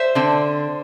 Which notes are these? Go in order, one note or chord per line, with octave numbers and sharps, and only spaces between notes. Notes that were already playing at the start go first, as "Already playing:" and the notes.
Already playing: C5 E5
D3 C4